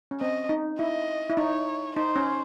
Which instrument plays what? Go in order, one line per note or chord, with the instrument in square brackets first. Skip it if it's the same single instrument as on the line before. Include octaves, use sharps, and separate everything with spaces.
[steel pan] C#4
[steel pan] C4 [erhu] D#5
[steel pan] D#4
[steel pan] E4 [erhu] D#5
[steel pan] E4
[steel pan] D#4 [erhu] C#5
[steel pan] D#4 [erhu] C5
[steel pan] C#4